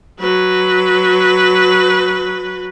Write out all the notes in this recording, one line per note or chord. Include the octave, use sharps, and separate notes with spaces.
F#3 B4